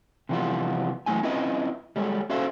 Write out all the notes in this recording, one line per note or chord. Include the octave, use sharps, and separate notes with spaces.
C3 E3 F3 G3 B3 F4
F#2 E3 F3 A3 D#4 G#5
C4 C#4 E4 F4 B4 D#5
G3 G#3 A4 C#5
C#4 F#4 A4 C5 E5 F5